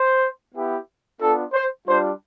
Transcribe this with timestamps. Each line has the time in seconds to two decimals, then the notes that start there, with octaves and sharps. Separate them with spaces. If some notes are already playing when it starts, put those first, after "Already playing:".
Already playing: C5
0.53 B3 E4 G4
1.20 B3 D4 F4 A4
1.53 C5
1.87 G3 D4 F4 C5